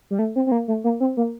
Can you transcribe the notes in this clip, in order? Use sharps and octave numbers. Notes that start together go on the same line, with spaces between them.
G3
A3
C4
C4
A#3
A3
A#3
C4
A#3